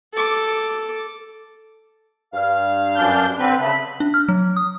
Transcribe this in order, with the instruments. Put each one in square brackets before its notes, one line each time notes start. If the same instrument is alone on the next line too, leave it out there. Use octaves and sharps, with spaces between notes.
[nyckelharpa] A4 D6
[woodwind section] G2 F5
[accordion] F#2 D4 G6
D3 C4 B4
[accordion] C#3 [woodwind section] E5 A5 B5
[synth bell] D4
F6
F#3
D#6